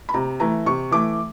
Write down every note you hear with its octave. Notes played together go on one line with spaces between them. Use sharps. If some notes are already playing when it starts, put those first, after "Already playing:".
B5
C3 A#5
E3 A3 A#5
C3 C#6
E3 A3 D6